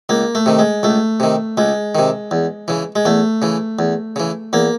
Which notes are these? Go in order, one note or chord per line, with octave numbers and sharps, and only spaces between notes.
C#2 A#3
A3
C3 D#3
G#3
C#2 A3
C3 D#3
C#2 G#3
C3 D#3
E2
C#3 E3
G#3
E2 A3
C#3 E3
E2
C#3 E3
E2 A#3